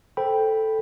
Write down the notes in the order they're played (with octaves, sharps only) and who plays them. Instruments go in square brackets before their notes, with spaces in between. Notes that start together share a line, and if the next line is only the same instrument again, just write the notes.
[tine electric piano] A4 C5 G5 B5